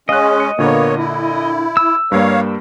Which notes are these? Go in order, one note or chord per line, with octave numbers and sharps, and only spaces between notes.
G#3 C#4 D#5 F5 F#6
C#7
A#2 D3 A#3 B3 A#4 C#5
E4
E6
G2 G3 A#3 C#5 F5